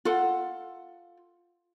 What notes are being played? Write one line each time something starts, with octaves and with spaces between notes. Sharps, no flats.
F4 A4 F#5